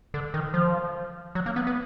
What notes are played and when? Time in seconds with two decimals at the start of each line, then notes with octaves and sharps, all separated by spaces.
0.14 D3
0.34 D#3
0.54 F3
1.35 F#3
1.46 A#3
1.56 B3
1.67 B3